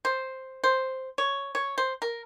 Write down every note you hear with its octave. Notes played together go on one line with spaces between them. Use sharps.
C5
C5
C#5
C#5
C5
A#4